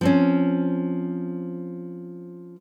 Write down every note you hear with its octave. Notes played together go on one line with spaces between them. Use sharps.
F3 C4 C#4